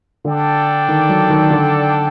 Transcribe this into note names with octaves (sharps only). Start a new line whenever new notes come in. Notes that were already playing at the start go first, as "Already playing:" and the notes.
D3 D4 A4 D5 G5
D#3
F#3
D#3
D3